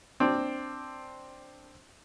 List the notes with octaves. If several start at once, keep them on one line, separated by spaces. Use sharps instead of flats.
C4 D4